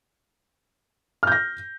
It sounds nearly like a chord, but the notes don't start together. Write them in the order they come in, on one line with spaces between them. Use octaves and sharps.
F6 G6 A#6